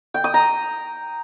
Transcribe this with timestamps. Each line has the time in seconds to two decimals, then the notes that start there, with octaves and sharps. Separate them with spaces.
0.14 G5
0.24 D#6
0.34 A#5